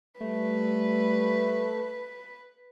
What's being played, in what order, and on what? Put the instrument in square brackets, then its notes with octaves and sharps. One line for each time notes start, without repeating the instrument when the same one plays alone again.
[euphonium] G3 [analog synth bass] A3 [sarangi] B4